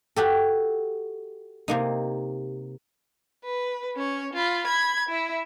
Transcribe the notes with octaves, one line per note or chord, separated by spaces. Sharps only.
F#4 G4 A4
C3 A#3 D#4
B4
C#4 C#5
F4 B5
B5 G#6
E4 E5